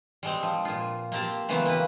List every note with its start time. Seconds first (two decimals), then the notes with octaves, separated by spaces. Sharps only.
0.23 G3 G#3 C4
0.43 F3
0.65 A#2 F4
1.12 A#3 C4 G4 A5
1.49 C#3 E3 F#3 B3 C4
1.66 A#3 B4